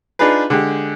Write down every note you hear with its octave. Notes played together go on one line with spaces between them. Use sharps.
D4 D#4 F4 G#4 B4
D3 G#3 G4